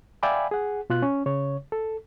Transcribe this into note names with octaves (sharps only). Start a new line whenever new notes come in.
D5 E5 F5 G5 G#5 B5
G#4 F#5
B2 F4 F#6
C#4
C#3 C#5
A4